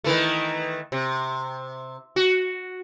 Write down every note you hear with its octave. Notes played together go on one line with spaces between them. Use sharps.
D#3 E3 A3
C3
F#4